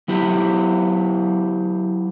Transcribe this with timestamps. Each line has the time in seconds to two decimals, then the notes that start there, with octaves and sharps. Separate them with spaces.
0.08 F#3 E4 G4